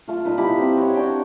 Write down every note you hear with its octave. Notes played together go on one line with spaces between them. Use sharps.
A3 F4
A#2 D#4 B4
D#4 E4 G4 B5
C4
F#4 C#5
D4 G5